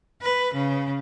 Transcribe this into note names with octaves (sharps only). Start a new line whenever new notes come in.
B4
C#3